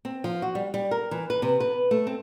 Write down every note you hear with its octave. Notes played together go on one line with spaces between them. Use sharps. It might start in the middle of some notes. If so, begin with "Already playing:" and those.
C4
F3
F#4
G3
G3
A#4
E3
B4
C3
B4
A3
C4